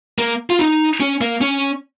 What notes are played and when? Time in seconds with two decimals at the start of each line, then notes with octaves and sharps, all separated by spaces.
0.18 A#3
0.50 F4
0.59 D#4
1.00 C#4
1.21 A#3
1.41 C#4